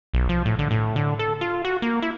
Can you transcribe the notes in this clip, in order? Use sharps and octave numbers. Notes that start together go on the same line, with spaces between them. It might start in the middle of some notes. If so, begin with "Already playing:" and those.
B1
F3
A2
D3
A2
D3
A4
F4
F#4
A#3
E4